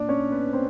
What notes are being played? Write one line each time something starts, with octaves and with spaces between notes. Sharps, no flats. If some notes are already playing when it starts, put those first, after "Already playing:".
Already playing: A#2 D4 D5
C#4 C#5
B3 B4
C4 C5